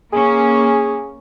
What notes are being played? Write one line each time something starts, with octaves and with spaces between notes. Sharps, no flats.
A#3 C#4 G#4